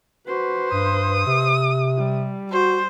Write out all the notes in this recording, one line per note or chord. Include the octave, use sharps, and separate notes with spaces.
F#4 B4 C5
G2 D#6
C3
G3
F#4 C5